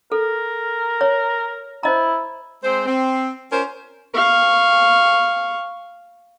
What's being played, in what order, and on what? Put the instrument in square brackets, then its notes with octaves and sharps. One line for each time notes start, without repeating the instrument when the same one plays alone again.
[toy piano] A4 [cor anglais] A#4
[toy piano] C#5
[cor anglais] E4 [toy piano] C5 D#5 A#5
[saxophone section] G#3 C4 C5
C4
C#4 F4 A#4 C5
[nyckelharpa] F5 C#6